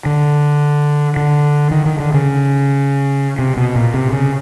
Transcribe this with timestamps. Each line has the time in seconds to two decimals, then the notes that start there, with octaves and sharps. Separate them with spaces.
0.06 D3
1.16 D3
1.71 D#3
1.86 D#3
2.00 D3
2.14 C#3
3.39 C3
3.57 B2
3.75 A#2
3.94 C3
4.12 C#3